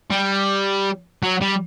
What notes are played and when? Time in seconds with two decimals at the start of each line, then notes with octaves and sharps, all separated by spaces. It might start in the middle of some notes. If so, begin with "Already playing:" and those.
0.11 G3
1.23 F#3
1.41 G3